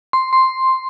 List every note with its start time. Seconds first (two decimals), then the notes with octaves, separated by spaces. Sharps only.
0.13 C6
0.33 C6